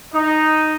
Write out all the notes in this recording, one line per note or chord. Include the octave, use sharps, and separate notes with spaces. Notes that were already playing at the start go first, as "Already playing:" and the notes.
D#4